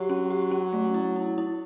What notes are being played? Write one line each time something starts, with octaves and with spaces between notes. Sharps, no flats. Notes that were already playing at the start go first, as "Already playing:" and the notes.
Already playing: F#3 G4
C#4
G4
C#4
A3
E4
E4
E4